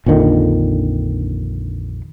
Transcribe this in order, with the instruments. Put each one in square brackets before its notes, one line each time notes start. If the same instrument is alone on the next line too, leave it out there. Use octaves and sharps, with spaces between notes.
[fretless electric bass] A#1 F2 D3 D#3